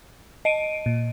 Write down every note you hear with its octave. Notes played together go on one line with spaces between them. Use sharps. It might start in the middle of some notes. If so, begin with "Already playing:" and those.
D#5 D7 D#7
A#2